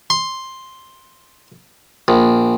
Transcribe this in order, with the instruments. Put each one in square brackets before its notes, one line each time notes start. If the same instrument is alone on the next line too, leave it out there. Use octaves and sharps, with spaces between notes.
[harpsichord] C6
A#1